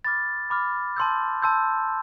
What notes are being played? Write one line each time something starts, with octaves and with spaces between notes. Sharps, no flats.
B5 D6 F6 A6
B5 D6 F6
A5 C6 E6 G6
A5 C6 E6 G6